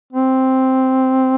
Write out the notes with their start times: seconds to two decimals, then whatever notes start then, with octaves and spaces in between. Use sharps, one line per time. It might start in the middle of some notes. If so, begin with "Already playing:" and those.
0.13 C4